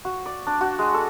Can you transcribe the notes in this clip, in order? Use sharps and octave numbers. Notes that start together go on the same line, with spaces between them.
F#4
D5
D4
F#4
G#3
A4